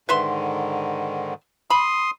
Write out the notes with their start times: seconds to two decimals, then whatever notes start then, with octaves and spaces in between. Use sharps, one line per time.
0.09 G#2 D3 D#3 B4 E5 C6
1.70 B5 C6 D#6